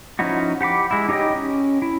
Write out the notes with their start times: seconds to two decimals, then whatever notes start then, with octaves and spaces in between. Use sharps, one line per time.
0.19 F3 C#4 D#4 E4 F#4
0.61 G4 F#5 B5 D6
0.91 G#3 E4
1.09 D#4 G4 C#5 D#5 G5
1.36 C#4
1.82 E4